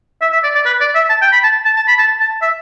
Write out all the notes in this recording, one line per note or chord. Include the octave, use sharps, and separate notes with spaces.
E5
E5
D5
D5
B4
D5
E5
A5
G5
B5
A5
A5
A5
B5
A5
A5
E5